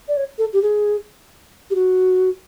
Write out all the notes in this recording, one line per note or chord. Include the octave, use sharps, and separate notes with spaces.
D5
C#5
A4
G4
G#4
G4
F#4